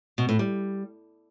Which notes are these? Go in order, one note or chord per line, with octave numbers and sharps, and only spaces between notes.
B2
A2
G3